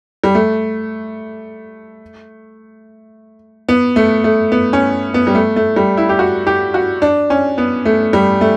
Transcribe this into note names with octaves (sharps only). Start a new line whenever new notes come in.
G3
A3
B3
A3
A3
B3
C#4
B3
G3
A3
A3
G3
E4
G4
F#4
G4
F#4
D4
C#4
B3
A3
G3
A3